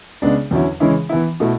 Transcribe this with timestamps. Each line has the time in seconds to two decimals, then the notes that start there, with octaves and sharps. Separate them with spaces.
0.22 C#3 G#3 B3 D4
0.51 E2 D3 F#3 C#4 E4
0.80 C#3 E3 G#3 C#4 E4
1.09 E3 B3 E4
1.40 B2 A3 E4